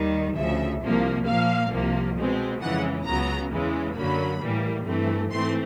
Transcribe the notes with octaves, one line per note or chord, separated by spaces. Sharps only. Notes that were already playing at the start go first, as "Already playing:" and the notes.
Already playing: D#2 D#3 G3
D2 C#3 F3 E5
C2 C3 F3 A#3
A#2 F3 A#3 F5
C2 C3 F3 A#3
B2 G#3 C4
F2 C#3 E3 G#3 F#5
C#2 C#3 F#3 B3 A#5
E2 C#3 E3 G#3
F#2 D3 F#3 A#3 B5
A2 E3 G3 A#3
G2 E3 A3 C4
G#2 E3 A3 C4 C6